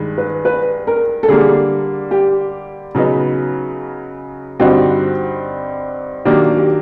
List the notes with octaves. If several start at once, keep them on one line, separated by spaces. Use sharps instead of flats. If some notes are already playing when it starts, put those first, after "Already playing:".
Already playing: G2 D#3 G#3
B4
B4
A#4
A4
D3 G3 A#3 G#4
G4
C#3 F#3 B3 D#4
G2 D3 G3 C4 D#4 F#4
D#3 F#3 A#3 D4 G4
G4